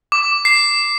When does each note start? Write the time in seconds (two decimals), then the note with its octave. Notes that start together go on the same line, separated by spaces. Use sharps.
0.12 D6
0.45 C7